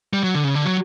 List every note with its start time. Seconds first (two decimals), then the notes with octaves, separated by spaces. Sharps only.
0.13 G3
0.23 F#3
0.34 D3
0.44 C#3
0.55 D3
0.65 F#3